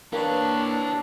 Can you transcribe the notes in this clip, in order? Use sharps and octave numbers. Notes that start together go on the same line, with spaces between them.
A#3 D4 G4 B4 C#5